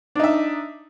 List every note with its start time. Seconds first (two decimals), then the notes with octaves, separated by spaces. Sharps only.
0.15 D4
0.19 D#4
0.23 E5